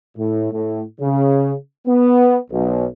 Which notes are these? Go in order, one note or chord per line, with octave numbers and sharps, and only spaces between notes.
A2
A2
C#3
B3
B1